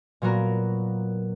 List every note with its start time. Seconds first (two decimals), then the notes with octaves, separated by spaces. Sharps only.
0.22 A#2 F#3 B3 F#4 A#4